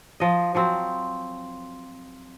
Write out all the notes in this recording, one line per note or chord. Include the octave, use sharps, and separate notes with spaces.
F3 D#5
F3 F#3 C4